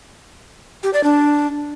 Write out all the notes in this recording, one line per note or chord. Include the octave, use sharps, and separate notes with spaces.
G4
D5
D4